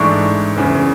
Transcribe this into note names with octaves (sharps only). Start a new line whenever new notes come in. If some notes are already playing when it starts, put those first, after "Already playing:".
Already playing: A1 G#2 E3 A3 D4 C#6
F#1 E2 C#3